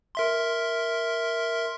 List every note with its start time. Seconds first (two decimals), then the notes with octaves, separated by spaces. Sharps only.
0.15 A#4 E5 C6